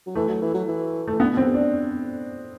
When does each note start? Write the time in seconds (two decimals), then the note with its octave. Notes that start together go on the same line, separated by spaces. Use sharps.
0.06 F#3
0.15 E3 A3
0.29 F#3
0.42 E3
0.54 F#3
0.68 E3
1.07 E3 A3
1.19 D3 B3
1.33 B2
1.37 F#2 C4
1.45 G2
1.54 D4